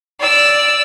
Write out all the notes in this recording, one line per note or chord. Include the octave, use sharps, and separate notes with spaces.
D5 E6